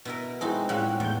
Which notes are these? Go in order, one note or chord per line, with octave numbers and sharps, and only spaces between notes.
B2 E4 A#4
G#3 C4 D#4 E4 F#4 G#4
A2 G3 C#4 F4 F#5 F#6
E2 A2 G6